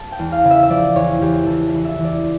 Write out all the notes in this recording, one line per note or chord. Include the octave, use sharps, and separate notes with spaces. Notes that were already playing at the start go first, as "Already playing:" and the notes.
Already playing: A5
G5
E2
F5
C#3
E5
E5
F3 D5
E2 C#5
E2 G4
E2 A4
A4
E3
E5
E3
D5